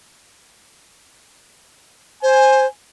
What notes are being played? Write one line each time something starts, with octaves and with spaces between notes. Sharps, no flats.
C5 G#5